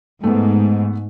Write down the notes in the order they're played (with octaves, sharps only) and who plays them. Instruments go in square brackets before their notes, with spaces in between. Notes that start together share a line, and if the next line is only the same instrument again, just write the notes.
[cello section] G#2 [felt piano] A3 B3